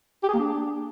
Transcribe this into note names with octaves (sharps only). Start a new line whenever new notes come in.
G4
G#4
A#3
D4